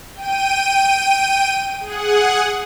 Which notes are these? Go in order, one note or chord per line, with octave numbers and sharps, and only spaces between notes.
G5 D#7
G#4 F#5